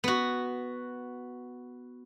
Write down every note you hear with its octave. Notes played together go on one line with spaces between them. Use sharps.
B3 F#4